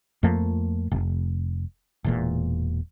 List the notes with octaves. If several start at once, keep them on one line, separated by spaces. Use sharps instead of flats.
F2 F3 A3 A#3
F1
E1 E2 A#2